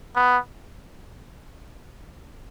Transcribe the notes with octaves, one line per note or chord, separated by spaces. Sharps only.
B3